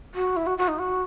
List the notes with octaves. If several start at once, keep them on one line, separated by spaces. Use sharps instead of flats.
F#4
E4
F#4
F#4
D#4
F#4